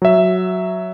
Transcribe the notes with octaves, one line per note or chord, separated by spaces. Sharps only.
F#3 E5